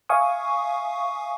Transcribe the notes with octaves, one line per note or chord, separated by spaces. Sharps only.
E5 F5 G#5 C#6 D#6